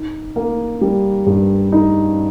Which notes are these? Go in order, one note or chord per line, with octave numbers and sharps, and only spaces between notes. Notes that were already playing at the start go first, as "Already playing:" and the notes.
Already playing: D#4
A#3
G3
G2
D#4